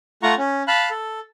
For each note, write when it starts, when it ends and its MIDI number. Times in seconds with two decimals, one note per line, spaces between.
0.23 0.34 57
0.23 0.34 65
0.23 0.34 78
0.23 0.34 82
0.23 0.34 85
0.38 0.63 61
0.68 0.89 77
0.68 0.89 81
0.68 0.89 83
0.68 0.89 90
0.91 1.20 69